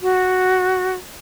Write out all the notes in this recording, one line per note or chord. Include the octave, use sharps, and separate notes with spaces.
F#4